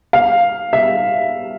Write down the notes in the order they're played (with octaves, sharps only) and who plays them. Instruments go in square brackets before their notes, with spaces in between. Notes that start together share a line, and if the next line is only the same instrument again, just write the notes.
[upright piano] F5
E5